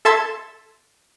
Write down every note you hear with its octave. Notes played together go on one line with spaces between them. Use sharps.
A4 E5 A5 C6 E6 G#6